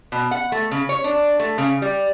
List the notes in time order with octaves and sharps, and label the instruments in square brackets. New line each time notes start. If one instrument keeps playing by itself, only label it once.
[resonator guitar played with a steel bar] B2
F#5
A3
C#3
C#5
D4
A3
C#3
G3